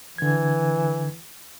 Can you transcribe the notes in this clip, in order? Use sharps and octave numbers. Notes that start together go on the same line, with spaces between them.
D3 E3 G#6